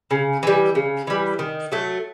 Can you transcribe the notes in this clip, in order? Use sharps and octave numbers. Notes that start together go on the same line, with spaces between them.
C#3
E3 G3
C#3
E3 G3
D#3
F#3 A3